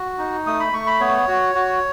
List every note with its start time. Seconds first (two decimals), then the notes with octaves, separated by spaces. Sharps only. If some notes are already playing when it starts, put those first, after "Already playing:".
Already playing: F#4
0.18 D#4
0.46 A3 D#6
0.60 B5
0.73 A3 C#6
0.86 B5
1.00 B3 C#5
1.28 F#4
1.55 F#4